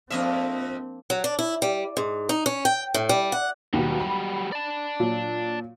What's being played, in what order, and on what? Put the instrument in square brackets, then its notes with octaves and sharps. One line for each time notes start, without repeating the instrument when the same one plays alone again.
[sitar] F2 D#5 E5 [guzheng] F3 A#3 D4 [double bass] C4
[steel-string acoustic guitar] F#3
D4
E4
G3
G#2
D#4
C#4
G5
A2
G3
F#5
[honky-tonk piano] D#2 B2 [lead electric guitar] F#3 G3
[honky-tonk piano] B5
[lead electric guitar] D5 A5
[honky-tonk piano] A#2 F#3